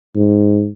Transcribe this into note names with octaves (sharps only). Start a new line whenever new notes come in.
G#2